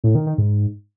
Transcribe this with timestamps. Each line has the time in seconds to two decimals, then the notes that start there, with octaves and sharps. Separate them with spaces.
0.04 A2
0.15 D#3
0.27 D#3
0.38 G#2